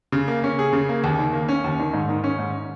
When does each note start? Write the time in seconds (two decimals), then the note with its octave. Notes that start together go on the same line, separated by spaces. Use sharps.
0.12 C#3
0.28 A#3
0.44 C#4
0.59 G#4
0.73 C#3
0.89 A#3
1.04 D#2
1.19 D#3
1.33 A#3
1.48 C#4
1.64 D#2
1.79 D#3
1.93 G#2
2.09 D#3
2.24 C#4
2.39 G#2